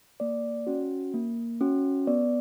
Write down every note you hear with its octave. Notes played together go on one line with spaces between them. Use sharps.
A#3 D5
C#4 F#4
A#3
C#4 F#4
B3 D5